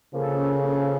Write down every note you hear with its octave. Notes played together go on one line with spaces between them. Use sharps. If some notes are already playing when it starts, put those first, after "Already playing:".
C#3 F3 A#3 C#4 A4
F3 A#3 C#4 A4